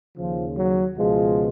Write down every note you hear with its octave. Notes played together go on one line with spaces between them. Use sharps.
D#2 C#3 F3
F#3
C#2 B2 F3 G#3